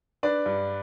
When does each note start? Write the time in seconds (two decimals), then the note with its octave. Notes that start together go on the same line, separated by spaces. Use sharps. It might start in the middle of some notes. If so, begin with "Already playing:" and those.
0.23 D4 B4 D5
0.46 G2